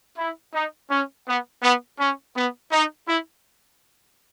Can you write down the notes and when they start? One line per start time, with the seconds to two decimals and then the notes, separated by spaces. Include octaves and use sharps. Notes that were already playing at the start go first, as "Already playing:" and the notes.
0.18 E4
0.54 D#4
0.90 C#4
1.27 B3
1.63 B3
1.99 C#4
2.36 B3
2.72 D#4
3.08 E4